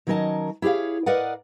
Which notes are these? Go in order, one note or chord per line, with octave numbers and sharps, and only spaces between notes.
D#3 F#3 C#4 A#4 D#5 A5
E4 G4 G#4 C#5 F5
A#4 B4 D5 D#5 F5 F#5